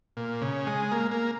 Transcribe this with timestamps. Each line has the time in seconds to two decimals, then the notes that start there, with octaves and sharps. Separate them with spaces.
0.17 A#2
0.42 C#3
0.67 G#3
0.92 A#3
1.11 A#3